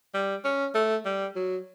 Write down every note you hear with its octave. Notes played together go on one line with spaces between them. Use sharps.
G3
C#4
A3
G3
F#3